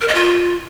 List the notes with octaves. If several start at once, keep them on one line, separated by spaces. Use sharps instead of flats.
A#4
D#5
F4